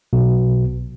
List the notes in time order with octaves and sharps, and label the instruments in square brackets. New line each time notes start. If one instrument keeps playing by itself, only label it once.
[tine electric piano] B1 B2